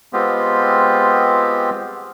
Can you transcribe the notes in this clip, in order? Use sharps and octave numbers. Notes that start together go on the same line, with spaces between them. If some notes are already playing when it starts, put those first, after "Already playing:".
G#3 B3 C4 F4 G4